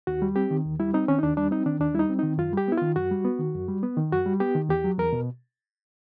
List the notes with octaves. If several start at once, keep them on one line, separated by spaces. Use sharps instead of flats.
D#2 F#4
G3
C4 G4
D#3
D#2
G3 E4
C4 D#4
D#3 C#4
D#4
D#2 D4
G3 D4
C4 D#4
D#3 D4
D#2 D4
G3 D#4 E4
C4
D#3 D#4
F#2 F4
G3 G4
B3 E4
D#3 F4
F#2 F#4
G3
B3
D#3
F#2
G3
B3
D#3
F#2 F#4
G3
B3 G4
D#3
E2 G4
F#3
E2 A#4
B2